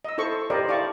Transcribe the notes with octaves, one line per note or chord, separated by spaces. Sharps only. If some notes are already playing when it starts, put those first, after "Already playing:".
D#5 E6
E4 A4 C5 C#6
G4 A#4 C5 D5 D#5
E4 D5 F5 A5 C#6